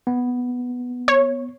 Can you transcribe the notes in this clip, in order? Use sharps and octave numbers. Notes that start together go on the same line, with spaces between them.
B3
C#5